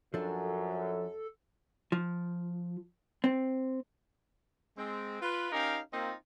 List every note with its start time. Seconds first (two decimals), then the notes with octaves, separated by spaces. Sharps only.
0.14 F#2 F3 D4 A4
1.92 F3
3.24 C4
4.77 G#3 C4
5.21 F4 B4
5.52 C#4 D#4 G4 A#4 F5
5.93 A#3 C4 D#4 F4